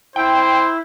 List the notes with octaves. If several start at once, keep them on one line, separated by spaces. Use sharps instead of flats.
E4 C5 G5